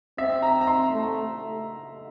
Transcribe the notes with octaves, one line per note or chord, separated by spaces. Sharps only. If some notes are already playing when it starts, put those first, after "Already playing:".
C4 E5
A#5
A#5
C6
A3